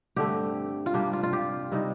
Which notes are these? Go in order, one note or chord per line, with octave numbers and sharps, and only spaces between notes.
G2 D3 A3 C4 G4
F4
C3 G3 A#3 D4 G4
F4
F4
G4
C3 G3 C4 D#4